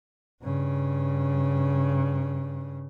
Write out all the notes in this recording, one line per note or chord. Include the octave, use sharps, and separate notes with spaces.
G2 C#3